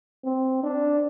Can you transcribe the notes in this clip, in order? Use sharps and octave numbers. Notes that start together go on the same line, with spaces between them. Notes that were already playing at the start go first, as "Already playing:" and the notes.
C4
D4